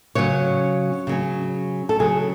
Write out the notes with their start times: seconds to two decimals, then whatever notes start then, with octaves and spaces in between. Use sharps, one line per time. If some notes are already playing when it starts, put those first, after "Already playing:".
0.15 C#3 F#3 C#4 C#5
1.07 C#3 F#3 C#4
1.89 A4
1.99 C#3 F#3 C#4 G#4